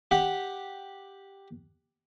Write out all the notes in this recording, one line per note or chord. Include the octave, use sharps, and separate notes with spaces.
G4 F#5